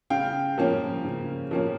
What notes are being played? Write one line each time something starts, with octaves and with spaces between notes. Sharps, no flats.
C#3 F5 G5
F3 A#3 C#4
C#3
F3 A#3 C#4